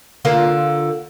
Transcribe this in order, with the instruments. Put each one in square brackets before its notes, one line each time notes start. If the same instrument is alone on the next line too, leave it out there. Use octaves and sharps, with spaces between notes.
[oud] D3 A#3 F4